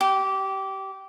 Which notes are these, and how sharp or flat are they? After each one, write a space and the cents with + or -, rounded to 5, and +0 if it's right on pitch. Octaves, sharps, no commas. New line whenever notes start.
G4 -20